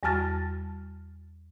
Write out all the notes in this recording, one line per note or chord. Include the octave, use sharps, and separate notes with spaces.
E2 G3 F#4 A5 F6 A6